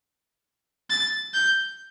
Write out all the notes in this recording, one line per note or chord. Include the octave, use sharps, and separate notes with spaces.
A6
G6